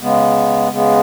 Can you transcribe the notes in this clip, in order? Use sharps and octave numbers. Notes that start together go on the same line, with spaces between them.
C#3 G#3 B3
C#3 G#3 B3